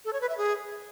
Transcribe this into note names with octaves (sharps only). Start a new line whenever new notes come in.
A4
C#5
B4
E5
G#4